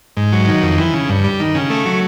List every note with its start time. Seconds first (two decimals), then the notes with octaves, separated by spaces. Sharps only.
0.17 G#2
0.32 F#3
0.47 D#3
0.63 F2
0.78 E3
0.94 C#3
1.09 G2
1.24 G3
1.40 D#3
1.55 C#3
1.70 A3
1.86 F#3